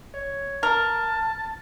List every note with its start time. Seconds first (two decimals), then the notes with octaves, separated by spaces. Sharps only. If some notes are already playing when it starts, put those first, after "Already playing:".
0.14 C#5
0.63 A#4 A5